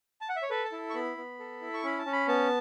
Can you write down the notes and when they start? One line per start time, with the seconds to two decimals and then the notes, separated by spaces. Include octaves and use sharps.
0.21 A5
0.29 F#5
0.36 E5
0.43 C#5
0.50 A4 B4
0.65 A5
0.72 E4
0.90 C#6
0.94 B3 B5
1.17 B3
1.40 A4
1.61 E4
1.74 C#6
1.84 C#4 B5
1.99 A5
2.06 C#4
2.13 B5
2.28 B3 A5